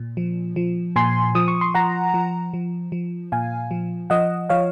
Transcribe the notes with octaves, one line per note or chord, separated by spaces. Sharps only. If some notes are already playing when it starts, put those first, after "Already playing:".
Already playing: A#2
F3
F3
A#2 G#5 C6
F3 D#6
C#6
C6
F3 F#5 A#5
F3
F3
F3
A#2 F5 G#5
F3
F3 D#5 F#5
F3 C#5 F5